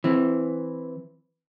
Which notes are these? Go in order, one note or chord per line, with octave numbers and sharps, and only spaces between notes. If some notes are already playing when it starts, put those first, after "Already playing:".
E3 C4